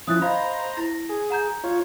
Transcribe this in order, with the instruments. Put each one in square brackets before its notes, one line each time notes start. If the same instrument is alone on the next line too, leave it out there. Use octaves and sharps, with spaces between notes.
[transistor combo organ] F3 C#4 E4 [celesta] D#6 F#6 A6
[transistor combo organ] C5 A#5 [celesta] D#5 F5 B5
[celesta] E4 A#6
[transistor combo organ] G#4
[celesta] F#5 A#5 G6
[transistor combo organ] F4 C#5